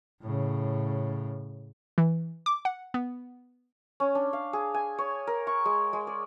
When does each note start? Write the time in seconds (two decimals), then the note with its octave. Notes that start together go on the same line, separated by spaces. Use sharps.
0.22 A2 C#3
1.98 E3
2.46 D6
2.65 F#5
2.94 B3
4.00 C#4
4.15 D4
4.33 F5
4.53 G#4
4.74 G#5
4.98 C#5
5.27 A#4
5.47 C#6
5.65 G#3
5.93 G#3
6.07 D5